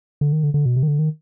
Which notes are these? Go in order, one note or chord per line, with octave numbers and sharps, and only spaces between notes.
D3
D#3
D3
D3
B2
C3
D#3
D3
D#3